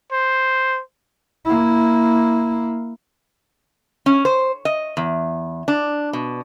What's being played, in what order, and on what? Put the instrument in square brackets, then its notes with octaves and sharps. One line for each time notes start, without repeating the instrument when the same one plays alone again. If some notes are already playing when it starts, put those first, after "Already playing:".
[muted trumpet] C5
[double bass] A#3 E4
[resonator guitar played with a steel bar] C#4
C5
D#5
E2
D4
B2